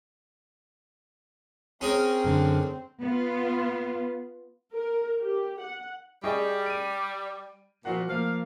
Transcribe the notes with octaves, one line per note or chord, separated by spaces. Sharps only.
C4 C#4 G#4 A#4
F#2 D3
B3 F4
A#4
G4
F#5
G3 G#4 D#5 C#6
D7 D#7
A#2 F3 F#4 F#5
F3 A#3 F5